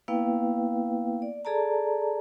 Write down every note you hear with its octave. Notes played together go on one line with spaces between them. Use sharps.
A#3 B3 E4 B4 F5 G5
D5
G#4 A4 D5 A5 A#5